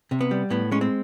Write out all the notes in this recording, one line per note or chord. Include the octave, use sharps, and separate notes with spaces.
C3
B3
G3
A2 B3
G#3 C#4
C4